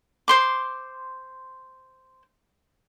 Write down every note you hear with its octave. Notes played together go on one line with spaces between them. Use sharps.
C5 C6 D6